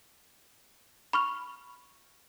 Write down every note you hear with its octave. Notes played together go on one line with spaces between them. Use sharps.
B5 C#6 F6 F7